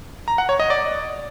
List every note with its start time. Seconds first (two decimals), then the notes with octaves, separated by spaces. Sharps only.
0.28 A#5
0.38 F#5
0.49 C#5
0.60 D#5
0.70 D5